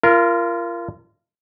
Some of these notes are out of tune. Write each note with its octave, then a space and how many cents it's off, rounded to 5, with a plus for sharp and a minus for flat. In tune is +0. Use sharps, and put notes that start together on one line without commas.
F4 -30 A#4 +0